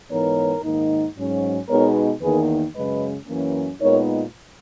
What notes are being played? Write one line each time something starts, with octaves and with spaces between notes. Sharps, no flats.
G#2 E3 B3 D#4 A#4 C#5
G#2 D#3 A#3 D#4
G#2 F#3 C#4
B2 G#3 B3 D#4 A#4 C#5
E2 D#3 A#3 D#4 G#4 B4
F#2 C#3 G#3 C#4 B4 D#5
F#2 E3 A#3 C#4
A#2 G#3 B3 D#4 A#4 C#5